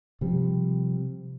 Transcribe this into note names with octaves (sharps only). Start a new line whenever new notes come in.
C3 F3 G3